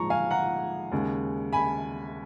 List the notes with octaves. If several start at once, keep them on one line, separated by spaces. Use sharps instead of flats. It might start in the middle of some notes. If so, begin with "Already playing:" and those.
Already playing: A#1 G#2 F3 G#3 A#5 C#6
F5 G#5
F#5 A#5
D#2 C#3 G#3
G#5 B5